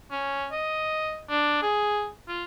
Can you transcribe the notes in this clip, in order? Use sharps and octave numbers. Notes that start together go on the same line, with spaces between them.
C#4
D#5
D4
G#4
F4